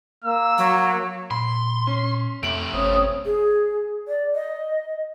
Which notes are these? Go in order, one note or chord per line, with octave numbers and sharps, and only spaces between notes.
A#3 E6
F#3
A#2 B5 C6
C#4
F2 C3 A3 D7 F#7
G1 C4 C#4 C#5 D#6
G#4
D5
D#5